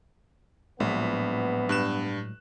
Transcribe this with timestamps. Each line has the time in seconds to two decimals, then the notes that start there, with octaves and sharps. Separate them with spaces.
0.80 A#1 A2 F#3 G#3 B3
1.69 G2 F#6 E7